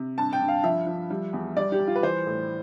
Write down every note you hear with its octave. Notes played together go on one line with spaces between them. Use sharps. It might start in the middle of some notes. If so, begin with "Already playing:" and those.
Already playing: C3
G2 A5
G5
G2
F5
F3 E5
F3
G3
E2
G3 D5
G4
G3
F4
B4
E3 C5
A2